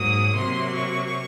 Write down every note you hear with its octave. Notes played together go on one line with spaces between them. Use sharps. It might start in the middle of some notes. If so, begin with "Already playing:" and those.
Already playing: G#2 F#3 A#3 D#6
C3 F#3 A#3 C6
C#6